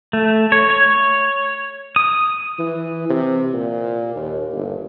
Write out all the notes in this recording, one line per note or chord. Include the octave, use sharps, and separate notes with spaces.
A3
C#5
C#5
D#6
E3
C3
A#2
D#2
G1